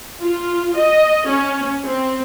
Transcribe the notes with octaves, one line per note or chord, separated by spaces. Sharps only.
F4
D#5
C#4
C4